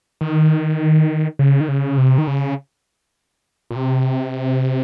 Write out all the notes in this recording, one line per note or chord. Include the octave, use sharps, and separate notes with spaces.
D#3
C#3
D#3
C#3
C3
D#3
C#3
A#2
C3